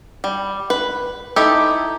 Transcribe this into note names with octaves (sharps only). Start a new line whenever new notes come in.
G3
B4
D#4 E4 G4 A4